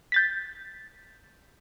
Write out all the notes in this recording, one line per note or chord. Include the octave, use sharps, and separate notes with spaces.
G6 A6 B6